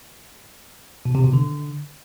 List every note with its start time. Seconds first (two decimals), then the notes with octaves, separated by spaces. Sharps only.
1.05 B2
1.15 C3
1.24 B2
1.33 D3